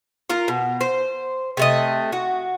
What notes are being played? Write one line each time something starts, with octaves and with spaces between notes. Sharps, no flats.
F4 A#4
B2
C5
C3 A3 D#5
F#4